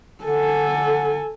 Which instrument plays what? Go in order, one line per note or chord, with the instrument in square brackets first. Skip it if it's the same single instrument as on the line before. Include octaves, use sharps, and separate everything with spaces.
[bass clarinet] D3 [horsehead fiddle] A4 G#5